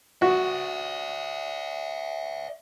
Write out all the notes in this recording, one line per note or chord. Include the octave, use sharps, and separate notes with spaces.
F#4 D5 E5